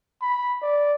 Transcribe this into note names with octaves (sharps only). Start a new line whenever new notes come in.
B5
D5